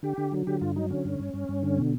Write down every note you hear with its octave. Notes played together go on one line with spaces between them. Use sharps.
D3 G4
D3
F#3
D3 G4
G2 F4
F#3 D#4
D3 C#4
G2
G2
G2
G2
D3
B2